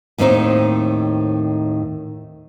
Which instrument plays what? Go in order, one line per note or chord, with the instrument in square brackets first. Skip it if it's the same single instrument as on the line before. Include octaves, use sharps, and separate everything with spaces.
[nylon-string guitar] D#2 A2 D#3 C4 D#4 C5